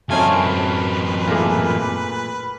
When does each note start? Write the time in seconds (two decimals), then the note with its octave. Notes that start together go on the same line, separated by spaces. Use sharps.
0.10 F#2 A3 C4 C#4 D#4 F4 G#5
0.33 A#4 B4
1.28 A#2 A3 G#4 A#4 D6